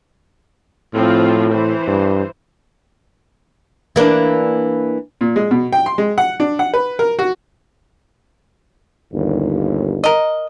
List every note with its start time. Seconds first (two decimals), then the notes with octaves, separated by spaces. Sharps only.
0.95 A2 F3 C4 F4
1.52 E3 C5
1.88 G2
3.96 E3 A#3 D4
5.21 A#2
5.36 G#3
5.51 B2
5.73 G5
5.86 C6
5.98 G#3
6.18 F#5
6.40 D4
6.59 F#5
6.74 B4
6.99 A#4
7.19 F#4
9.12 G1 D#2
10.04 A#4 D#5